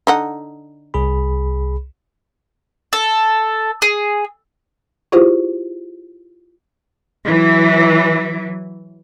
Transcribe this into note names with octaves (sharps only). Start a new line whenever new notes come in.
D3 D#4 F#5
C2 G#4 B5
A4
G#4
E4 F4 G4 G#4 C5
E3 F#3